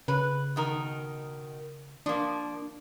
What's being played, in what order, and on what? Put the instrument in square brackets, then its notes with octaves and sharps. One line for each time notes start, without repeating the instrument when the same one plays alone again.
[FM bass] C#3 [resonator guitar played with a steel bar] B4
[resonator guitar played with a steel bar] B2 D#3 A#4
[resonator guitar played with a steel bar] F3 A#3 [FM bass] D4